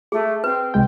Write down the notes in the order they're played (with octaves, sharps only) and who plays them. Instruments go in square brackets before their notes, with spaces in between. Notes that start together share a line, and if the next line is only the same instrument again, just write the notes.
[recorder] A3 [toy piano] G#4
[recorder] C4 [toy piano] B4
[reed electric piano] C2 G#3 G5